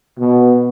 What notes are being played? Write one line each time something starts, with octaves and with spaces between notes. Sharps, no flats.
B2